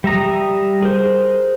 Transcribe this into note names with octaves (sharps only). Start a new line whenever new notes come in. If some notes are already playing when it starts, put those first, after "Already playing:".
G3 E5 A#5 D#6
G#4 A#4 C5